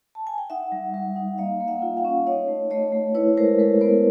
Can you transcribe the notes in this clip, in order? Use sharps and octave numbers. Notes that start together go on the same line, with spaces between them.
A5
G#5
G5
D#4 E5 F#5
G3
G3
D#4
A#3 D#5 F5
A#3
E5 F#5
F4
F5 G5
C#4
D#4 C#5 D#5
A3
A3 C#5 D#5
A3
E4 B4 C#5
G#3 A#4 C5
G#3 A4 B4
B3 A#4 C5